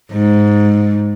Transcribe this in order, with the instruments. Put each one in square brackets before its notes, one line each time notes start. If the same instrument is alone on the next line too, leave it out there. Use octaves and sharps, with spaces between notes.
[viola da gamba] G#2